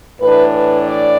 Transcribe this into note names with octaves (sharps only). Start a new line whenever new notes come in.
A2 E3 D4 B4
B4
D5